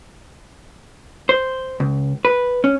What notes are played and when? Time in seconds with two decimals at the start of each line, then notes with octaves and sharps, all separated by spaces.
1.29 C5
1.80 C#2
2.25 B4
2.64 C#4